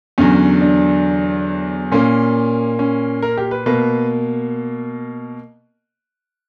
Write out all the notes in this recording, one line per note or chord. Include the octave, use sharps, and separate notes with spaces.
E2 D3 F#3 C#4
D4
A#2 A#3 C#4
C#4
A#4
G4
B4
B2 A#3 B4